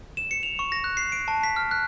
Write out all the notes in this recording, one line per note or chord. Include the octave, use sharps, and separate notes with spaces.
E7
C#7
F7
C#6
A#6
F#6
C7
D7
A5
B6
F6
F#6